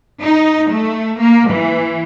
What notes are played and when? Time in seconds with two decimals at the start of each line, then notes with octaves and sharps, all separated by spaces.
0.23 D#4
0.71 A3
1.20 A#3
1.50 E3